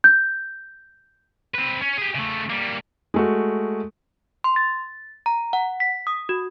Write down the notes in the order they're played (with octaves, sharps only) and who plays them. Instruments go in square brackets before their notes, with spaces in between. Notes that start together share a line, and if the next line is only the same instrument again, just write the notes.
[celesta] G6
[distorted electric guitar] C4 B4
C#4
G4 G#4
C#3 A3
G3 A#3
[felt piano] G#3 A3 F#4
[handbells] C6
A6
A#5
F#5
B6
D#6
F#4